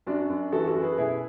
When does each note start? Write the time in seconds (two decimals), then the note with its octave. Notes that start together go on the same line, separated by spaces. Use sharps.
0.06 F#2 D4 F#4
0.30 F#2
0.52 E3 F#4 A4
0.67 F#4 A4
0.75 F#2
0.82 G#4 B4
0.98 B2 E4 G#4